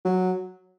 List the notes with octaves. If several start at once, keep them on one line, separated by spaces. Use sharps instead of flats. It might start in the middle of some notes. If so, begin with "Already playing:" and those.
F#3